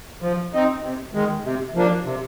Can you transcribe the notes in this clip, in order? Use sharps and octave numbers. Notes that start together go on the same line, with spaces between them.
F3
C4 D#4
C3
D#3 G#3
C3
F3 A#3 D4
C3